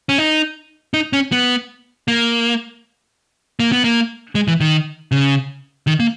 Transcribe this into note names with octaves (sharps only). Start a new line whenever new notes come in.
C#4
D#4
D#4
C#4
B3
A#3
A#3
B3
A#3
G#3
E3
D#3
C#3
D#3
A#3